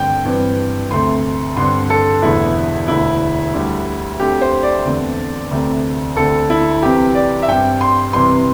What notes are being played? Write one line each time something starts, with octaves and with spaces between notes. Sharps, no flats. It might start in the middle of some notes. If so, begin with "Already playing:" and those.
Already playing: G2 D3 A3 C4 G5
G2 E3 C4
D2 C3 A3 C4 C6
G2 D3 C4 C6
A4
E1 E2 D3 A3 E4
E1 D2 D3 E4
D2 D3 G3
D2 D3 A3 C4 G4
C5
D5
E2 D3 A3 C4
D2 C3 A3 C4
D2 D3 C4 A4
E4
C2 C3 E3 C4 G4
D5
E5
G2 G3 C4 G5
C6
C2 C3 E3 G3 C4 C6